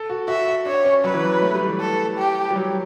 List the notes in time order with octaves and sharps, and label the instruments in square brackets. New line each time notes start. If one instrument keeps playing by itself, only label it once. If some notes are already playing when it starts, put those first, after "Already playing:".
Already playing: [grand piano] A4
F#4
[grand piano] F#4 [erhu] E5
[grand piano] F#4
[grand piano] D4 [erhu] C#5
[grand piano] C#4
[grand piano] F#3 [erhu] B4
[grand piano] E3
F#3
A3
G3
E3
[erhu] A4
G4
[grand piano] G3
F#3